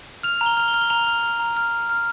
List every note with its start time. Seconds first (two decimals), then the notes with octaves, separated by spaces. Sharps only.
0.23 F6 F7
0.41 A#5
0.46 G7
0.57 F6 F7
0.68 G7
0.74 F6
0.81 G7
0.90 A#5 F7
1.07 F6
1.23 F6
1.40 A#5
1.57 F6
1.73 F6
1.89 F6